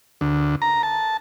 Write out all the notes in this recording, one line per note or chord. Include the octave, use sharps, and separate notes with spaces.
D2
A#5
A5